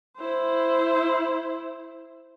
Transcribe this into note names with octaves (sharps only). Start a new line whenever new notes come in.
E4 C5